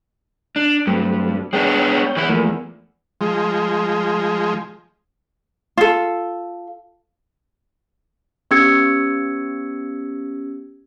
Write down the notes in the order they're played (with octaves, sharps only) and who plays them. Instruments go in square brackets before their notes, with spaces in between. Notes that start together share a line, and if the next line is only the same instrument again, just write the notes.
[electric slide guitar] D4
[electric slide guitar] G2 [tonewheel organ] F#3 A3 C4
[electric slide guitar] G#3 B3 D4 [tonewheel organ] C#5 G5
[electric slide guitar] E3 B3 E4
[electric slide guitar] E2 [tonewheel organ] F3 A3 A#3
[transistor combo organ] F3 G#3
[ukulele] F4 A4
[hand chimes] B3 C#4 G4 E6 G#6 C#7